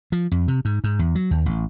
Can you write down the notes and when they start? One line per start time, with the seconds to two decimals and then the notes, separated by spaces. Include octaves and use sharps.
0.12 F3
0.31 F2
0.48 C3
0.65 G#2
0.84 G#2
0.99 E2
1.15 F#3
1.31 D#2
1.46 A1